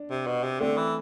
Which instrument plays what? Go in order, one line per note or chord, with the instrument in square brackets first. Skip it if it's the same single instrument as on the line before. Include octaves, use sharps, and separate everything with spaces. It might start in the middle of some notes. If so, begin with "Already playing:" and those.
Already playing: [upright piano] D4
[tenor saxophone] C3
B2
C3
[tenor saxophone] D3 [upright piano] A3 C4
[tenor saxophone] E3